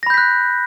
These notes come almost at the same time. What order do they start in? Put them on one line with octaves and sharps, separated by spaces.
A#6 B5 G6 B6 F#6